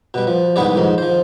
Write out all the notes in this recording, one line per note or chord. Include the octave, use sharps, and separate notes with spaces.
B2 G3
F3
C2 G#2 G3 B3 G#4 D5
F2 G#2 D#3
F3 C5